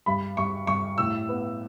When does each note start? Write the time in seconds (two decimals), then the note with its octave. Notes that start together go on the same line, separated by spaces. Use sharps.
0.06 G2 B5
0.37 G2 C#6
0.67 G2 C#6
0.98 A2 E6
1.29 B3